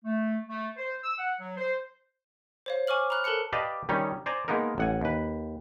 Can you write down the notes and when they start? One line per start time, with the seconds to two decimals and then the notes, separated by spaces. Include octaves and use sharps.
0.05 A3
0.49 A3
0.77 C5
1.04 E6
1.18 F#5
1.38 F#3
1.57 C5
2.66 C5 C#5 F5
2.87 G#5 C#6 D6 F6 F#7
3.10 A#5 B5 F6 F#6
3.24 A4 A#4 A5 F#6 C#7
3.53 G4 B4 D5 D#5 F5 A5
3.89 D#3 G3 C#4 D#4 C#5
4.26 C5 D5 G#5 A#5
4.48 G#3 A#3 B3 D#4 A#4
4.78 A1 F#5 G#5
5.01 D#2 B4